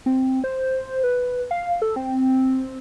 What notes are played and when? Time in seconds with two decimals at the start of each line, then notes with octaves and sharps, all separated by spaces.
0.06 C4
0.44 C5
1.03 B4
1.51 F5
1.82 A4
1.96 C4